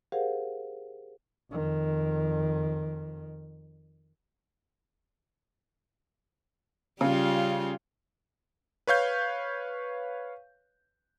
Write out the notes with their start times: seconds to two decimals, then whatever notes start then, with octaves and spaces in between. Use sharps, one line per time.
0.12 G4 G#4 A#4 C5 F5 F#5
1.51 F2 D#3
7.01 C#3 G3 F4
8.87 B4 C#5 F5 G6